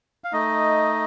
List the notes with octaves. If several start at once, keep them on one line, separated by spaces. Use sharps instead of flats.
F5
A3 D#4 D#5